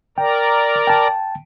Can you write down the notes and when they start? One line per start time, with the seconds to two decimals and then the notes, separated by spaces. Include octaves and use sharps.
0.18 A#4 D5 G5 A#5
0.87 G5 A5